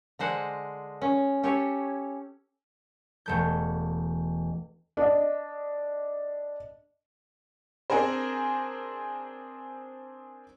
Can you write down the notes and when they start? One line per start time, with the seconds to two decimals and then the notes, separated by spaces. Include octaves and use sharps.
0.19 D3 G#3 C5 F#5
1.02 C#4
1.43 C#4 G4 A4 C#5
3.26 E1 A3 G6
4.97 D4 D#5
7.90 C4 D4 G#4 A#4 C5